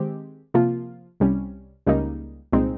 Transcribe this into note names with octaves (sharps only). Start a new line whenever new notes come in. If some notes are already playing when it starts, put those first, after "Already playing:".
Already playing: D#3 G#3 C4 G4
C3 F3 A#3 F4
C2 C3 G3 C#4
C#2 C#3 G3 A#3 D#4
C2 A#2 G#3 C4 D#4